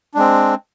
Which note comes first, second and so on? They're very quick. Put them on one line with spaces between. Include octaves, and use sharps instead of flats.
D4 G#3 C4